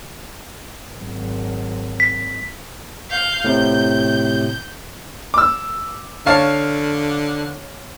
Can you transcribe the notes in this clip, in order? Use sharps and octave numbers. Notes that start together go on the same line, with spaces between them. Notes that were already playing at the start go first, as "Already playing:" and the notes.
G#1 F#3
B6
F5 G6
A2 C3 G6
D6 E6
D3 C#5 F5 A5